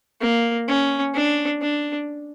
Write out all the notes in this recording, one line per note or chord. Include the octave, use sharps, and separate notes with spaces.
A#3
C#4
D4
D4